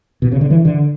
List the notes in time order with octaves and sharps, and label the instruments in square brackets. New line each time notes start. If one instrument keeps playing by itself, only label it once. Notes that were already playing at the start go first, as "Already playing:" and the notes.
[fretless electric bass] B2
C#3
D3
E3
D3